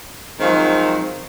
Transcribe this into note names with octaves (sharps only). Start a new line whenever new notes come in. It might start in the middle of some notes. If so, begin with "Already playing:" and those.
D#3 F3 F#3 G#3 C4